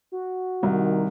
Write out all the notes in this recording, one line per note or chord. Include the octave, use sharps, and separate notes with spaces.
F#4
C2 D#3